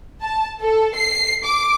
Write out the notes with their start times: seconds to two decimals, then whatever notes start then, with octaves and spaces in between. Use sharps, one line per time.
0.22 A5
0.61 A4
0.96 C7
1.44 D6